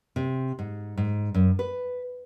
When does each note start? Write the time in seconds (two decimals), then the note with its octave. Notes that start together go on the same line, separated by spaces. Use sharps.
0.16 C3
0.59 G#2
0.97 G#2
1.34 F#2
1.59 B4